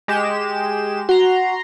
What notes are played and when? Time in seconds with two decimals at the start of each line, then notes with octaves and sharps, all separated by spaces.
0.08 G#3 G4 E7
1.09 F#4 A#5 C6